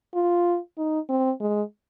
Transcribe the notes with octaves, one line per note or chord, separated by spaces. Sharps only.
F4
D#4
C4
G#3